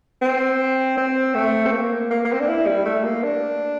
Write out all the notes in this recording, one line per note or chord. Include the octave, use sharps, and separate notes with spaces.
C4
C4
A3
C4
A#3
A#3
A#3
C4
D4
E4
G3
A3
A#3
D4